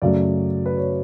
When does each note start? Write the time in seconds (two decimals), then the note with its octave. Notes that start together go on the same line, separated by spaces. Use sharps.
0.02 F#2 C#3 F#3 A3 D5
0.66 B4
0.77 C#5